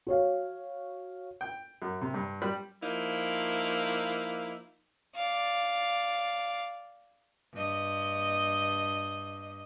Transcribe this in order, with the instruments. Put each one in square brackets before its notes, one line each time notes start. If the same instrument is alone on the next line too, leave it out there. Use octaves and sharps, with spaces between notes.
[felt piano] F#4 C#5 F5
[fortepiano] G5
F#2
C3
G2
G3
[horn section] F3 A#3 D#4 E4
[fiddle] D5 F5
[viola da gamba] G2 D#5